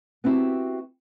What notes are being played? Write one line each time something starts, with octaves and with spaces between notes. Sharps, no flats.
B3 C4 D4 E4 F#4 G4